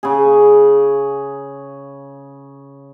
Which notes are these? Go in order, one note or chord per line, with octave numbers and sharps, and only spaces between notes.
C#3 G#4